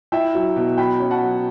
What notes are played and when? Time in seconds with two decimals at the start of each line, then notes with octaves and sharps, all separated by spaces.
0.12 E4 E5 G5
0.35 F#3
0.56 B2
0.78 F#3 G5 B5
1.00 C#4
1.10 F#5 A5
1.22 F#3